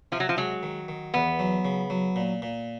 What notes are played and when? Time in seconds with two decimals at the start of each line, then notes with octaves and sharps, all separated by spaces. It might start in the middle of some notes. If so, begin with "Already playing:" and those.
0.12 C3 F3
0.20 F#3
0.29 F3
0.37 F#3 G#3
0.63 D#3
0.88 D#3
1.14 E2 B3
1.39 F#3
1.65 C#3
1.90 F#3
2.16 A#2
2.42 A#2